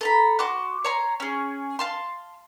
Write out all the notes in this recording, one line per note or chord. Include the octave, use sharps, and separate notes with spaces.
A4 A#5 B5
F#4 C6 D6 F#6
C#5 A#5 C6
C#4 G#4
F5 A5 C6